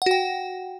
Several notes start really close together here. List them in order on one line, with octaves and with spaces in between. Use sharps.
F#5 F#4 G5